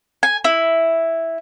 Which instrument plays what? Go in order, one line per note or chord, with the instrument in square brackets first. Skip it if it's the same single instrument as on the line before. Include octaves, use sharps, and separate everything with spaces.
[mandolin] G#5
E4